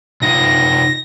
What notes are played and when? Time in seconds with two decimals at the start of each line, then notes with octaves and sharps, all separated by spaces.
0.22 C3 D#4 F4 A#6